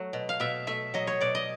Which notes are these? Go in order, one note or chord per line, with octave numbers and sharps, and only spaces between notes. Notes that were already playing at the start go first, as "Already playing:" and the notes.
Already playing: F#3 A3
B2
F5
B2 E5
A3 E5
F#3 D#5
C#5
B2 D5
D#5